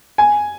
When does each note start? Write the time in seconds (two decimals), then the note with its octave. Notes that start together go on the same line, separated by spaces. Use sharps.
0.18 G#5